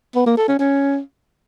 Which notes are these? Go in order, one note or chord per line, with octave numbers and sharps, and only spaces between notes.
B3
A#3
A4
C#4
C#4